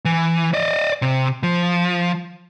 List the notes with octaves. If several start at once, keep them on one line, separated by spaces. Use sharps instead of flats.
E3
D5 D#5
C3
F3